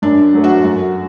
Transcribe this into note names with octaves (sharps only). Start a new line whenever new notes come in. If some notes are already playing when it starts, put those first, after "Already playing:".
F#2 D4
F#3 A3
F#4
F#2 F#4